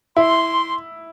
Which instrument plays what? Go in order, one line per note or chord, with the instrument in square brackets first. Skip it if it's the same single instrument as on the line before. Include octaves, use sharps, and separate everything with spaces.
[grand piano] E4 [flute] C6